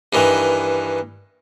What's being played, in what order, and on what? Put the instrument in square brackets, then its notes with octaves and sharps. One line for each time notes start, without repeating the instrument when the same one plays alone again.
[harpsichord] G2 D#3 E3